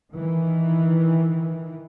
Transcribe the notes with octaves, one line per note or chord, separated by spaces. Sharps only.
D#3 E3